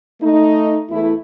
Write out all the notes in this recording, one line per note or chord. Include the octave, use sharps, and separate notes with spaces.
A3 D#4
E2 A3 E4